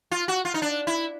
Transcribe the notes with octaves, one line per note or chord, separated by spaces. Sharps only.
F4
F#4
F4
D#4
D4
E4